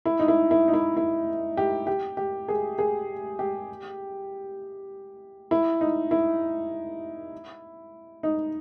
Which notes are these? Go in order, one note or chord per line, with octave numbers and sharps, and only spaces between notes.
E4
D#4
E4
E4
D#4
E4
E4
G4
G4
G4
G#4
G#4
G4
E4
D#4
E4
D#4